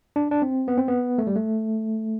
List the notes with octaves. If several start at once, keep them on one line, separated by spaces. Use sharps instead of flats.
D4
D4
C4
B3
C4
B3
A3
G3
A3